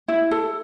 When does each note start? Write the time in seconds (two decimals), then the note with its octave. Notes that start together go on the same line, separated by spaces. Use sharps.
0.08 E4
0.31 A4